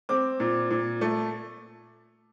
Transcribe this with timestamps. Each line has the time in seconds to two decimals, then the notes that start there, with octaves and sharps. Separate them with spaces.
0.09 C4 D6
0.40 A#2
0.70 A#2
1.01 A3